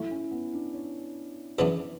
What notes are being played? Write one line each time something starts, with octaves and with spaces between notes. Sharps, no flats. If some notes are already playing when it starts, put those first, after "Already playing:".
Already playing: F#3 A3 E4
C#4
B3
D4
C#5
F#2 C#3 E3 B3 D4